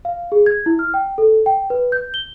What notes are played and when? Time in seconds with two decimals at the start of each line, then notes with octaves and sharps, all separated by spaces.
0.05 F5
0.32 G#4
0.46 G#6
0.66 E4
0.79 F6
0.94 G5
1.18 A4
1.46 G5
1.70 B4
1.92 G6
2.14 G7